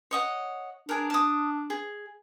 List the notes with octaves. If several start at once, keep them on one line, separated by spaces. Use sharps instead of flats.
C#5 D#5 F#5
D4 G#4 A#4
A5 D#6
G#4